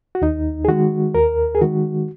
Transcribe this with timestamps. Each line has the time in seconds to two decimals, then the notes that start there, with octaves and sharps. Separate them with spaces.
0.15 F#4
0.22 D#2 D#4
0.65 G#4
0.68 D#3 G#3 F#4
1.14 D#2 A#4
1.55 G#4
1.61 D#3 G#3 F#4